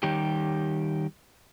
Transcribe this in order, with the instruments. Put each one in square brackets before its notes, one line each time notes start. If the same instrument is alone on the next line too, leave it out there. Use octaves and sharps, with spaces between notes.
[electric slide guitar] D#3 G3 G4